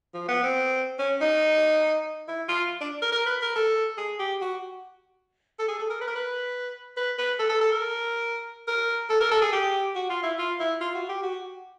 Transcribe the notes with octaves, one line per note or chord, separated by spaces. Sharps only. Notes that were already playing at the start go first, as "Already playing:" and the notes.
F3
B3
C4
C#4
D#4
E4
F4
D4
A#4
A#4
B4
A#4
A4
G#4
G4
F#4
A4
G#4
A4
A#4
B4
A#4
B4
B4
B4
A4
A4
A4
A#4
A#4
A4
A#4
A4
G#4
G4
F#4
F4
E4
F4
E4
F4
F#4
G4
F#4